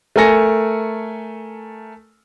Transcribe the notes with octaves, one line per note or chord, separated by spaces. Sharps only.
A3 A4 A#4 G#5 A#6 C#7